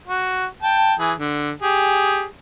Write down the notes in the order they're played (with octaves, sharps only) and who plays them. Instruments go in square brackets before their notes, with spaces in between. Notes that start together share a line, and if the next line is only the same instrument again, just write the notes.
[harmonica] F#4
G5 A5
E3 G#4
D3
G4 G#4